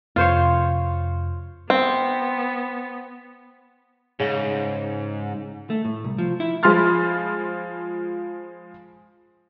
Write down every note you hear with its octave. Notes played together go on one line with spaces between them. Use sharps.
F2 C3 F4 C5 C#5
B3 C4
G#2 C#3
A3
A2
C2
F3
E4
F3 G#3 B5 C6 F6 A6